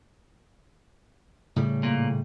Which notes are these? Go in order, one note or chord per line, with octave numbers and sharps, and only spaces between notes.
A2 C#3 G3
A#2